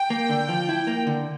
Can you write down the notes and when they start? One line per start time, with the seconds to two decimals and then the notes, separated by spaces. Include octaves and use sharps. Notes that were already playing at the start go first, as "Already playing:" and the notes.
Already playing: G5
0.10 A#3
0.29 D3
0.49 F3
0.69 E4
0.87 A#3
1.07 D3